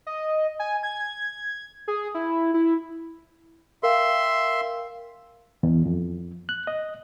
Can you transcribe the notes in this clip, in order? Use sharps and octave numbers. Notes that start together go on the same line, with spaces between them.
D#5
G#5
G#6
G#4
E4
E4
A#4 E5 F5 G5 C6
E2
F2
F#6
D#5